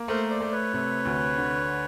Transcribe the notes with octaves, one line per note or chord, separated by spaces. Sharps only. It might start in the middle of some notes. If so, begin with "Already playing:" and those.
Already playing: A#3
A3 A#4 C5
C5 D5
A3
B4 C#5
C3
D2
D3